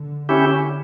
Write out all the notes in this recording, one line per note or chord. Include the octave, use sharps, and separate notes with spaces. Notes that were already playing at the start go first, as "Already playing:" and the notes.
Already playing: D3
D3 C#4 E4 G4